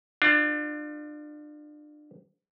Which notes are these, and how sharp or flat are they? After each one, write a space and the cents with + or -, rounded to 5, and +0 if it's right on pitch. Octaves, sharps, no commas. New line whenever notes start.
D4 +30 F4 +0